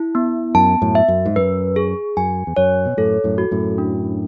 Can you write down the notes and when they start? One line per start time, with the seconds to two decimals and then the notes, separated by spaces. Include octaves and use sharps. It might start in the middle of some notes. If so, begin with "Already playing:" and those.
Already playing: E4
0.15 B3
0.55 F#2 A5
0.82 F#2 A2
0.95 E5
1.08 F#2
1.26 G#2
1.36 F#2 B4
1.76 G#4
2.17 F#2 G#5
2.47 E2
2.57 F#2 C#5
2.86 B2
2.97 F#2 A2 A4
3.24 F#2 A2
3.38 F#4
3.51 F#2 A2
3.78 D4